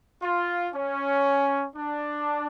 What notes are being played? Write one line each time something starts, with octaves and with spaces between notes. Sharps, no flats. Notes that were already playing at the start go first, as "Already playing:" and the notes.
F4
C#4
D4